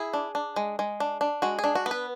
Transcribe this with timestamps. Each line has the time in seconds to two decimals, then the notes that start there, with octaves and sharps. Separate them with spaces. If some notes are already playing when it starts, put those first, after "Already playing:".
Already playing: E4 G#4
0.13 D4
0.35 D4
0.56 G#3
0.79 G#3
1.00 D4
1.21 D4
1.42 G#3 F#4
1.59 G#4
1.64 D4
1.75 F#4
1.86 B3
1.91 B4